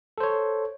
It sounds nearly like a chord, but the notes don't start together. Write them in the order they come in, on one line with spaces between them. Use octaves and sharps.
A4 C5 C#5